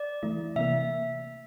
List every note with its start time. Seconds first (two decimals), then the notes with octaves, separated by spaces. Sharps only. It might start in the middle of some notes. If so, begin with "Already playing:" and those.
Already playing: D5
0.23 E3 A3 E4
0.56 C3 E3 A#3 E5